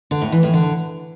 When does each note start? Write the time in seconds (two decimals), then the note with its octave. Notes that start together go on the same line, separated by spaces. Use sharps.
0.11 D3
0.22 A2
0.32 E3
0.43 A2
0.54 D3